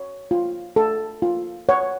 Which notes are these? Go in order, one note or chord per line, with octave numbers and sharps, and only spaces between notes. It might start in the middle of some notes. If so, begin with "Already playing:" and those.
Already playing: C#5
F4
A4
F4
C#5 F#5